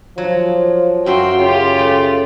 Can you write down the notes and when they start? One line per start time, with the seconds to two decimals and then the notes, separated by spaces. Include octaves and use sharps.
0.18 F3 F#3
1.06 F#2 F#4 E5 G5 C6
1.38 C#3 F4 G4
1.79 A3